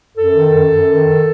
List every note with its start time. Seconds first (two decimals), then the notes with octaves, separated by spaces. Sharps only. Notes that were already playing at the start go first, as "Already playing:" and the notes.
0.17 F#2 A4
0.35 D#3
0.54 F#2
0.72 F#2
0.91 D#3